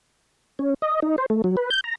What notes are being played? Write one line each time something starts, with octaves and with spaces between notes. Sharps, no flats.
C#4
D#5
D#4
C5
A3
F#3
B4
G6
A#5